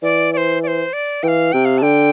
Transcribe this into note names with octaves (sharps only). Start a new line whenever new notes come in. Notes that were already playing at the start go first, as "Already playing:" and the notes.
E3 D5
D5
C5
D5
C5
D5
E3 F5 G5
C3 G5
F5
A5
D3 G5